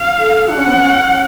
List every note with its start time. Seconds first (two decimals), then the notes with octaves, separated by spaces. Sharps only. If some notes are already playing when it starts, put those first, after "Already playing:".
Already playing: F5
0.18 A4
0.48 D4 F#5
0.57 C#4
0.67 B3
0.76 C#4